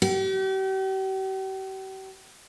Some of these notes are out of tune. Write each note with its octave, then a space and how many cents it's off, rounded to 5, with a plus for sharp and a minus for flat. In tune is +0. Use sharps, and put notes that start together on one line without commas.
G4 -40